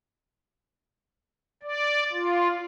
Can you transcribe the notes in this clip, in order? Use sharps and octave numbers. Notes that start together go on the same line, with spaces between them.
D5
F4